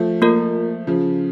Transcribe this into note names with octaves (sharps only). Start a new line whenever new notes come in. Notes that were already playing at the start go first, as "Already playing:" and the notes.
Already playing: F3 A3
A#3 F4 A#4
C#3 F3